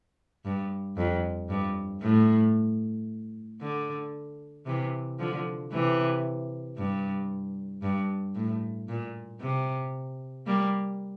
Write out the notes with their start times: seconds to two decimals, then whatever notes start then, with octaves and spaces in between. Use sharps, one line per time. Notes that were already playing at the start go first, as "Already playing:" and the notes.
0.45 G2
0.97 F2
1.49 G2
2.02 A2
3.61 D3
4.66 C3 E3
5.20 D3 F3
5.72 C3 E3
6.78 G2
7.83 G2
8.35 A2
8.89 A#2
9.41 C3
10.47 G3 A#3